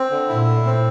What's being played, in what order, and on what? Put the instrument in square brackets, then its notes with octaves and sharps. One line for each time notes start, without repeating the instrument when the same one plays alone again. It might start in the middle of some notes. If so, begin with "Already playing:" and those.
Already playing: [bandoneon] C4
D3
[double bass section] A#2 [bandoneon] E4
[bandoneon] A2
C4